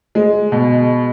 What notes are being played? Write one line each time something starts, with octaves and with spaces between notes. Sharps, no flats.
G#3
B2